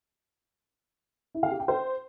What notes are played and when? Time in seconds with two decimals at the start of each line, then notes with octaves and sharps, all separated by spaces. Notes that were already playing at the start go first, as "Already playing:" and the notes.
1.35 E4
1.43 F5
1.51 G4
1.60 G5
1.68 C5